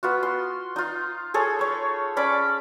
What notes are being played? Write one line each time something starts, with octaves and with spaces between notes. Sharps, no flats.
B3 F4 F#4
C6
D#4 F4
G#4 A4 C#5
C#5 B5
C#4 D5 B5 D6